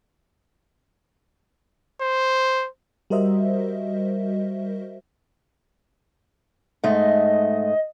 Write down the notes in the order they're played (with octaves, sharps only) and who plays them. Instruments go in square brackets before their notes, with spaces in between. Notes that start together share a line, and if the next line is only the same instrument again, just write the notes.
[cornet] C5
[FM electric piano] G3 F#4 A#4 C5 D#5 E5
[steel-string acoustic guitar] G#2 A3 [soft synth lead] D#5